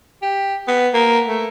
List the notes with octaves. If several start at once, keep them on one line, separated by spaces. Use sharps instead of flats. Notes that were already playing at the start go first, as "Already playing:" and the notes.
G4
B3
A#3
A3